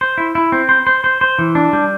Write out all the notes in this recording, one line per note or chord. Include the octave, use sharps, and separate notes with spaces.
C5
E4
E4
C4
C5
C5
C5
C5
E3
D4
G3